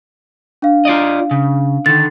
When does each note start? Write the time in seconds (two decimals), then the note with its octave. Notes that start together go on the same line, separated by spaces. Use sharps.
0.62 D4 F5
0.85 F4 D5 D#5
1.31 C#3
1.86 D3 D#3 A6